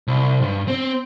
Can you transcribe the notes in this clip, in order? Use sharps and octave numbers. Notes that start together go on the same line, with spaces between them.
C2
G2
C4